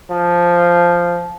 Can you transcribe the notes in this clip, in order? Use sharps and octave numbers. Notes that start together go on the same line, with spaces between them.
F3